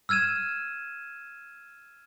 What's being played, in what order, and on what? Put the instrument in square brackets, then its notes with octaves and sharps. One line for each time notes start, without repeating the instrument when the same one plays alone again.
[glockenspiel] E6 F6 G#6 D#7 E7